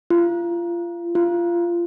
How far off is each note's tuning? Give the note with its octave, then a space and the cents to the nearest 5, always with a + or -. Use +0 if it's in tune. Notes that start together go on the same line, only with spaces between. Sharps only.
F4 -25
F4 -20